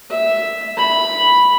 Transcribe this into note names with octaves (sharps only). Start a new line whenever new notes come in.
E5
B5